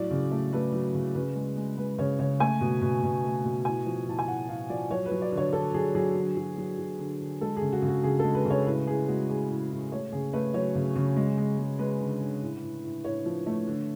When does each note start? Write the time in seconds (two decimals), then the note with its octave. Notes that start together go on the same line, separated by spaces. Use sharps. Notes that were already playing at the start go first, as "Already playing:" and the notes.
Already playing: A2 F#3 D5
0.11 C#3
0.31 A3
0.53 A3 B4
0.73 F#3
0.94 C#3
1.15 C#3 B4
1.35 G#3
1.57 G#3
1.78 G#3 B4
1.98 C#3 C#5
2.19 C#3 C#5
2.40 A3 G#5
2.61 B2
2.82 B2
3.03 B2
3.24 A3
3.45 B2
3.65 A2 G#5
3.86 F3
4.07 A2 A5
4.19 G#5
4.28 A2 F#5
4.49 A2 F5
4.70 F3 D5
4.90 F#3 C#5
5.06 B4
5.11 F#3
5.22 D5
5.32 D3
5.38 C#5
5.53 D3 A4
5.74 F#3 G#4
5.95 F#3 G#4
6.16 D3
6.37 F#3
6.57 F#3
6.78 F#3
6.99 D3
7.20 D3
7.41 G#3 A4
7.57 C#3 G#4
7.72 F#4
7.82 C#3
7.88 F#4
8.04 C#3 G#4
8.19 G#3 A4
8.35 B4
8.45 C#3 C#5
8.66 A2 B4
8.87 A2 G#4
9.08 G#3 F#4
9.29 A2 G#4
9.50 A2
9.70 A2
9.91 A3 C#5
10.12 C#3 G#4
10.33 A3 B4
10.54 F#3 C#5
10.75 C#3
10.96 C#3
11.17 G#3
11.38 G#3
11.59 G#3
11.79 G#3 B4
12.00 D3
12.22 D3
12.42 A2
12.63 A2
12.84 A2
13.04 A2 C#5
13.26 F3
13.47 A3
13.67 D3